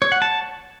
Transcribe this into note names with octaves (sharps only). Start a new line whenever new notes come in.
C#5
F#5
A5